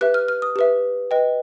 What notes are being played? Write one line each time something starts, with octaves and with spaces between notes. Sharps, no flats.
G4 B4 E5 F#6
F6
F6
D#6
G4 B4 E5
B4 D#5 G5